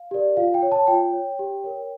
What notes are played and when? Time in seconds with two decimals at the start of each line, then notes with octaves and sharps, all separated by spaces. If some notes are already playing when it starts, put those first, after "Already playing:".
Already playing: F5
0.11 G4 A#4 D5
0.37 F4 F5
0.54 G5
0.62 C#5
0.72 A5
0.87 F4 G5
1.13 C#5
1.39 G4
1.64 A#4 C#5